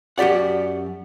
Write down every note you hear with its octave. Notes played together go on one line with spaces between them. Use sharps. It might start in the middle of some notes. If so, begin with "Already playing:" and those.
F#2 F#4 G4 D5 F#5